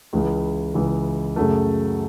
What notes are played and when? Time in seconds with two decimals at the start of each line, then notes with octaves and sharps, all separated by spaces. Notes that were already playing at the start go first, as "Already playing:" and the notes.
0.13 C#2 C#3 E3 G#3
0.74 C#2 C#3 E3 G#3
1.36 F#2 C#3 F#3 A3